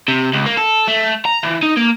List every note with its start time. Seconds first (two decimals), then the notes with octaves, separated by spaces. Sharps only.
0.08 C3
0.33 C#2
0.46 A#3
0.58 A4
0.88 A3
1.25 A#5
1.43 E3
1.63 D#4
1.77 A#3